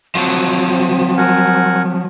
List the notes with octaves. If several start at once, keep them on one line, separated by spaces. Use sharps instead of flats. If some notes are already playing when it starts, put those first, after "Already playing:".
F3 F#3 C4
A#4 F#5 G#5